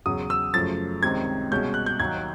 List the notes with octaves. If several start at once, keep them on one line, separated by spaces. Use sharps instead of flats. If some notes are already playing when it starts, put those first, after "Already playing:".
E2 C#3 F#3 D#6
E6
F#2 C#3 F3 A3 A6
C#2 C3 D#3 G3 C4 G#6
C2 B2 G#3 C#4 G6
F#6
G6
D#2 D#3 F#3 G#6